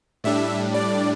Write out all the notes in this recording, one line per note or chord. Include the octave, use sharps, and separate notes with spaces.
A2 G3 D4 E5
D5